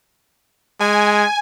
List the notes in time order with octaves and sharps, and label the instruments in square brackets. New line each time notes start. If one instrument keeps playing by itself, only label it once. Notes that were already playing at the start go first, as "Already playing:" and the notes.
[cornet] G#3 [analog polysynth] G#5